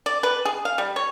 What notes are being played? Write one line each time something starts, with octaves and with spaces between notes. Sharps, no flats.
D5
B4
G#4
F5
G3
C#5